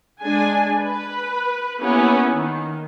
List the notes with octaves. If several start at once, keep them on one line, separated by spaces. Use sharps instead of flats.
G#3 D4 G#5
B4
A#3 B3 C#4 E4 G4 B4
D#3